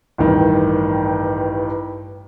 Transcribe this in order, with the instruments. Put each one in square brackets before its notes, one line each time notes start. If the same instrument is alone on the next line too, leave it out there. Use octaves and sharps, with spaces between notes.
[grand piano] A1 G2 D#3